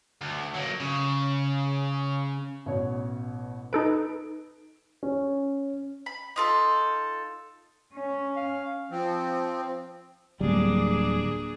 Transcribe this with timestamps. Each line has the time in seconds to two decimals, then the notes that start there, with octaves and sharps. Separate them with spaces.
0.21 D2
0.54 F#3 A#3
0.80 C#3
2.66 A1 B2 C#5
3.73 D#4 A4 B4 D7
5.03 C#4
6.06 B5
6.36 D#4 F4 A4
7.94 C#4
8.36 F5
8.90 F3 C4
10.40 D1 G3 A#3 D4 G#4